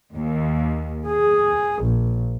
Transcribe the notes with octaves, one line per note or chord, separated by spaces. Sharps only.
D#2
G#4
A#1